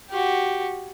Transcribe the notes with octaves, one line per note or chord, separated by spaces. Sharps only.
F#4 G4